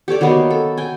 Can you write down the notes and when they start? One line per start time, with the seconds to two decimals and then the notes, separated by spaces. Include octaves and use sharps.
0.08 G4 A4 C#5 D5
0.21 D#3 F#3 A#3 B3
0.50 A4
0.77 G5 G#5